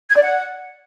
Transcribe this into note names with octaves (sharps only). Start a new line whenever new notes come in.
G#6
D5
F#5